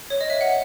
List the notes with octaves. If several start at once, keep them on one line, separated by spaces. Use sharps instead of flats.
C#5
D#5
E5
F#5